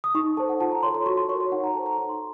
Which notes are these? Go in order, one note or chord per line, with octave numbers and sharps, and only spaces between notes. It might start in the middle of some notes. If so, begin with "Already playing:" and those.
D#6
D#4 C#6
A4 C5 A5
F#5
F4 A5
A#5
A4 C#5 C6
C6
F#4 C#6
C6
A#4 C#5 C#6
C6
D#4 F#5
A#5
A4 C5 A5
A#5
D#4 A#5
C6